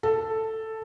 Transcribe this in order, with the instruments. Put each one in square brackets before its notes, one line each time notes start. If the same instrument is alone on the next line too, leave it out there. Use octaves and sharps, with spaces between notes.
[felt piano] A4